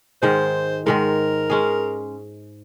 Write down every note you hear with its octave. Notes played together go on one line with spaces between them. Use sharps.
G#2 D#3 G#3 C5
G#2 D#3 G#3 A#4
G#3 C#4 G#4